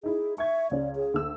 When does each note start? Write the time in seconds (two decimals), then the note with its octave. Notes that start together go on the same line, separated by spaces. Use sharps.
0.03 D#4 E4 G#4
0.38 E5 C#6 G#6
0.71 C#2 C#4 D5
0.96 G#4
1.14 D2 E6